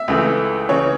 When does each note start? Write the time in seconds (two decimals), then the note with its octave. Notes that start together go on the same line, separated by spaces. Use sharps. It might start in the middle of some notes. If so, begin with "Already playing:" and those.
Already playing: E5
0.08 C#2 C#3 E3 A3
0.69 C#3 E3 C#5